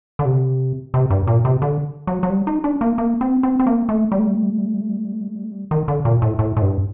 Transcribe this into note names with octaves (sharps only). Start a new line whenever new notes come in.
D3
C3
C3
G2
A#2
C3
D3
F#3
F#3
G3
D#4
D4
A#3
A#3
C4
C4
C4
A#3
A3
G3
A3
G3
A3
G3
A3
G3
A3
G3
A3
G3
A3
G3
A3
G3
A3
G3
A3
G3
D#3
D3
A#2
A2
A2
A2
G2